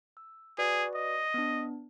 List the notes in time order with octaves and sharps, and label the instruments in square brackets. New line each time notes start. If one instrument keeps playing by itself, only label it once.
[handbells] E6
[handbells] F#4 B4 D5 [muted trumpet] G#4
[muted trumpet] D#5
[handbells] B3 D4